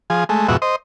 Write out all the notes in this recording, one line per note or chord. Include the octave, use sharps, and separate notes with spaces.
F3 G#4
G#3 A3
F2 G#2 B2 F#4 E5
C5 D#5